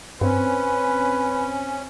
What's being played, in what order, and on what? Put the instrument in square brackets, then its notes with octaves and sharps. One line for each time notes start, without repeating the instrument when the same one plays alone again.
[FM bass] G2 [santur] C4 [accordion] C#4 [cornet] B4